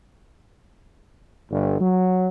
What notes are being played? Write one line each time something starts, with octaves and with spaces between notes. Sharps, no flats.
G1
F#3